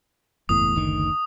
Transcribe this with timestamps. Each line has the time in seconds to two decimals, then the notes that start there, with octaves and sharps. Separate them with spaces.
0.49 F#1 E2 A2 D#6
0.76 F#1 D2 D#3